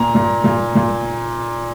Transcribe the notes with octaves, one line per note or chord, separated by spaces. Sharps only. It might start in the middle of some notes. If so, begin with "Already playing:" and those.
Already playing: A#2 A#5
A#2
A#2
A#2